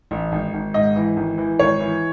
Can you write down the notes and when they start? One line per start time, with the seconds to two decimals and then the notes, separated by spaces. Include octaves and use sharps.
0.11 A1
0.32 G#1
0.54 G#1
0.74 G#2 D#5
0.96 E3
1.17 G#1
1.38 E3
1.59 G#1 C#5
1.80 E3